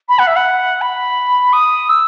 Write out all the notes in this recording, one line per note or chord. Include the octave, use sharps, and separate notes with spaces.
B5
F#5
E5
F#5
B5
D#6
E6